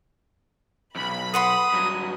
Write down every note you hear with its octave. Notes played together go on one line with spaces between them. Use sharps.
B1 F2 B5
B4 F#5 C6 D#6
G2 F#3